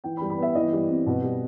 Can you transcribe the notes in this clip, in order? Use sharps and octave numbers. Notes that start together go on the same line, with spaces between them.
E3 G5
B5
G3
B5
B3 E5
E3 D#5
G3
C4
B2
G3